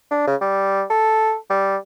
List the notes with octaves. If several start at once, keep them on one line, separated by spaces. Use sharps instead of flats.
D4
C#3
G3
A4
G3